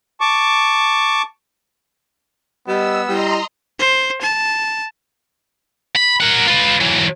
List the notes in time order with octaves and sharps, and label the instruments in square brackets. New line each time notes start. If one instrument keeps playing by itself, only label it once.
[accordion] A5 C#6 D6
[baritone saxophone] G3 [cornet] B3 [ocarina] D#5 [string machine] E6
[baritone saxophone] G3 [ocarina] E4 [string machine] D#5 A#5 C6
[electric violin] C5
A5
[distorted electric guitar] B5
A#4 F#5
F4 B4
E3 F#3